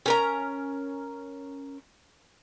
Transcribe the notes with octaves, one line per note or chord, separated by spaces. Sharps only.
C#4 A#4 A#5